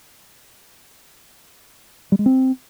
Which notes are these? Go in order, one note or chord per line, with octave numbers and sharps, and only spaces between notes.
G3
G#3
C4